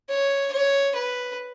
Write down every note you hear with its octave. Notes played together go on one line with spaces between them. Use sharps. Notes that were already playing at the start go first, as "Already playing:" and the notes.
C#5
C#5
B4